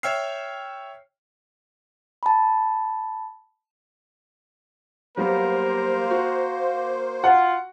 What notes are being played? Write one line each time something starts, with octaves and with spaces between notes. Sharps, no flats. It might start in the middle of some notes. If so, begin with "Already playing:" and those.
C#5 E5 G5 E6 F6 C7
A5 B5
F#3 G3 A#3 B3 A#4 C5
F#4
F4 F#5